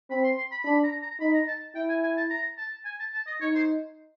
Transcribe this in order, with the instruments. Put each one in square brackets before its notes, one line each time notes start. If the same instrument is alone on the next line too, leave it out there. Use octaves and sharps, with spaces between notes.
[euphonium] C4 [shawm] B5
[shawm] C6
C6
B5
[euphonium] D4 [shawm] B5
[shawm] A#5
A#5
[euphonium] D#4 [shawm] B5
[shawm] A#5
A5
[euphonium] E4 [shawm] G5
[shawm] G#5
G#5
A5
A#5
A5
G#5
A5
A5
D#5
[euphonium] D#4 [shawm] C#5
[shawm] C5